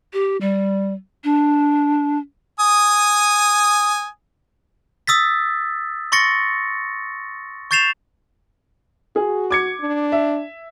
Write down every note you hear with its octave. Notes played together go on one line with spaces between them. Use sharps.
G4
G3
D4
G#5 D#6
D#6 E6 A6 B6
C6 C#6 A6 A#6 C#7
C#6 G6 A6 C7 E7 F7
F#4 G#4
D6 G#6 C#7
D4
E5